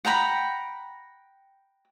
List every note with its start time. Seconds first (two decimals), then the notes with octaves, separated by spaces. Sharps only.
0.05 F#5 G5 A#5 B5